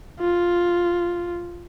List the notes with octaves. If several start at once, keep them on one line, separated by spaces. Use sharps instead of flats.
F4